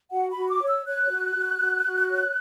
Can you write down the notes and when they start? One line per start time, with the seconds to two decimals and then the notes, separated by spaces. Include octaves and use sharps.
0.12 F#4 F#5
0.30 B5
0.36 F#4
0.49 D6
0.61 C#5
0.67 E6
0.86 C#5 F#6
1.10 F#4
1.36 F#4
1.60 F#4
1.85 F#4
2.10 C#5